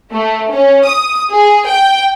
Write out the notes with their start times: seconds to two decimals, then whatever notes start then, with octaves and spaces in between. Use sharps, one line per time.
0.13 A3
0.52 C#4
0.86 D#6
1.32 G#4
1.68 G5